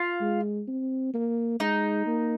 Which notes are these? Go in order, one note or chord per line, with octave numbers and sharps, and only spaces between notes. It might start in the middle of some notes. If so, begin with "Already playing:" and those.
Already playing: F4
G#3
C4
A#3
G#3 D#4
A#3